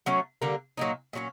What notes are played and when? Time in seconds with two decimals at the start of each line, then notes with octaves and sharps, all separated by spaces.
0.06 F#3 A3 C#4
0.42 D3 G3 A#3
0.77 A#2 F#3 A#3 D#4
1.13 A#2 F#3 A3 C#4